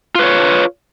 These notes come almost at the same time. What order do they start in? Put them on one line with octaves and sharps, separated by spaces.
F4 B4 C#5